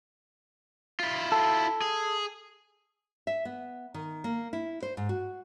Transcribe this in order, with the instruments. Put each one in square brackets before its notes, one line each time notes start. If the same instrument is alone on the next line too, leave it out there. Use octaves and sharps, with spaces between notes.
[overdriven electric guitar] E4 F4
[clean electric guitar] A4
[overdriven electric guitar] G#4
[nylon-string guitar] E5
B3
D#3
A#3
E4
C5
G#2
F#4